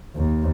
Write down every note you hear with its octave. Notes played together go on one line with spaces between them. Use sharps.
D#2